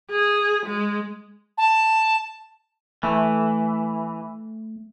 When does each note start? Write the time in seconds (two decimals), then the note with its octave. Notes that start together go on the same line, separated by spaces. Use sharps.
0.11 G#4
0.66 G#3
1.58 A5
3.03 E3 A3